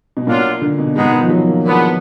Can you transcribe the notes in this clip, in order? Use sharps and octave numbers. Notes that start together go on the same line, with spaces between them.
B2
A#2 F#3 D4 F4
D3
B2
G#2 G#3 B3 D#4 G#4 B4
B2
D#3
F3
F#3
A#3
A#2 G#3 B3 D4